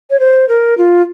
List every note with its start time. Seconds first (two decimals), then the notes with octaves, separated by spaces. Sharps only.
0.10 C#5
0.20 C5
0.49 A#4
0.78 F4